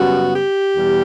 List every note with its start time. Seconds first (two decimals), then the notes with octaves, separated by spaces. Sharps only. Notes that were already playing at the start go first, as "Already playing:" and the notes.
Already playing: F#2 C#3 G3 B3 F#4
0.35 G4
0.77 E2 B2 G3